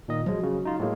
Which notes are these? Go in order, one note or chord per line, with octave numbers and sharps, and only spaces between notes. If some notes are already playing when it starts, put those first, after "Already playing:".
A#2 D#3 D#5
F3 F#3 G#3
C#3
D#4 F4
A2 G#3 A#3